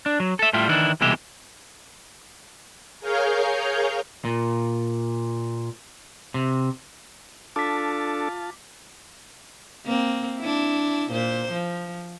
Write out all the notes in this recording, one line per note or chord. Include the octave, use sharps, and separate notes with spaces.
D4
F#3
A4 E5
A2 G3 F4 E5 G5
D#3 E3 D4 E4
C2 B2 E3 G#3 G4 E5
G#4 A#4 C#5 F5 F6 G6
A#2
C3
D4 F4 A4 A5 D6 B6
A#3 C4
D4 E4
A#2 C5
F3